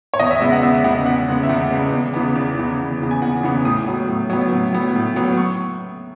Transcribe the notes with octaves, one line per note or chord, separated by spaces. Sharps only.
C#5
E2 D#5
E5
C#3 G#3 B3 E5
F#5
E2 E5
E5
C#3 G#3 B3 F#5
E2 F#5
C#3 G#3 B3
E5
E2 F#5
C#3 G#3 B3
E2
C#3 E3 B3
E2
C#3 E3 B3
E2
C#3 E3 B3
G#5
E2 F#5
C#3 E3 B3
A2 D#6
F#3 B3
A2
F#3 B3
A2
F#3 B3
A2
F#3 B3
C#6